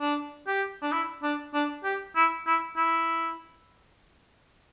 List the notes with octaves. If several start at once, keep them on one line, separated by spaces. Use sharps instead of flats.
D4
G4
D4
E4
D4
D4
G4
E4
E4
E4